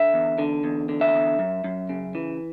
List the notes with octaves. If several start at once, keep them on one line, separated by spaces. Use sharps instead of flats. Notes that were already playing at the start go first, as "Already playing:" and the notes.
Already playing: D3 E5
E2
D3
E2
D3
E5
E2
F#2
F#2
C#3
E3